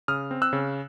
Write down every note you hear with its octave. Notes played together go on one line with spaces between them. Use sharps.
C#3 D#6 F6
C4
E6 F#6
C#3